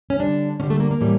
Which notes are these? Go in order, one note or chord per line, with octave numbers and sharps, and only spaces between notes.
C#4
D3 G3 D4
D3 G3 C#4
A3
A#3
A#3
A2 E3 G3